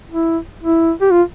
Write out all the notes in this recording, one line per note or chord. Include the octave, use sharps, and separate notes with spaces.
E4
E4
G4
F4